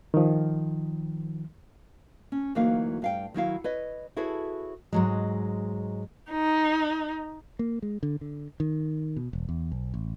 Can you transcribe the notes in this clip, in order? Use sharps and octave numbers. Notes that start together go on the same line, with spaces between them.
D#3 F3
C#4
D2 E3 F#3 A#3 D#4 F5
G2 F5 G5
D#3 F#3 E4 F5
B4 C#5 D#5
E4 F#4 G#4 A4 B4 C#5
G#2 F#3 G#3
D#4
A#3
G#3
D3
D3
D#3
B2
E1
E2
B1
A1